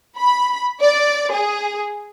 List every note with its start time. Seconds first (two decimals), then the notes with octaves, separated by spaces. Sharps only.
0.19 B5
0.82 D5
1.33 G#4